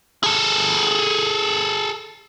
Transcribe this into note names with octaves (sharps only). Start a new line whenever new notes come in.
G#4 A4